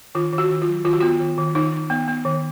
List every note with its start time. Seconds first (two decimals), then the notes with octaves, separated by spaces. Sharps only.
0.15 D#3 F4
0.33 D#3
0.38 F#4
0.50 D#3
0.62 F4
0.67 F#3
0.85 D#3 F4
0.93 F#4
1.00 B3 F4
1.20 D#3
1.38 D#3
1.55 D#3 D#4
1.73 D#3
1.90 B3
2.08 B3
2.25 D#3